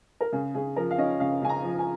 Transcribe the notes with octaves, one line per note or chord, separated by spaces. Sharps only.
A#4
C#3 G#4
C#3 G#4
F3 A#4
F5
C#4 D#5
C#3 F5
C#3 G#5
A#5
F3
G#5